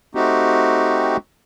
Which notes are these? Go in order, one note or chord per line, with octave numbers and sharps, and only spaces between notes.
A3 C4 D#4 F#4 G4